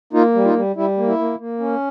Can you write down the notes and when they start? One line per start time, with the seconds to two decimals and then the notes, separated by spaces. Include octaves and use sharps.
0.13 A#3 D#4 F4
0.34 G3
0.44 D#4 F4
0.54 G3
0.76 G3 E4
0.97 A#3
1.07 E4
1.18 A#3
1.39 A#3
1.60 C#4